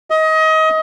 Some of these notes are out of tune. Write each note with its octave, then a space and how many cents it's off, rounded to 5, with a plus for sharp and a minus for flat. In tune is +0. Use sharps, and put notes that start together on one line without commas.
D#5 +25